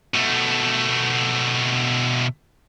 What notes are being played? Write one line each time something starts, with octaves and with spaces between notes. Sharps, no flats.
B2 A3